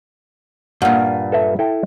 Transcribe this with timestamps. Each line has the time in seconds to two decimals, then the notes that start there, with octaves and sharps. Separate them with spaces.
0.82 G2 A#2 F#5
1.32 A4 B4 E5
1.59 E4 A4 G5